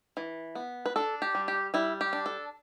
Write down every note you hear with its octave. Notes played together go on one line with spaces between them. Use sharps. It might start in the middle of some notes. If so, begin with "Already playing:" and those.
E3
B3
B4
D4 A4
G4
G3
G4
G3 E4
G4
D4
A4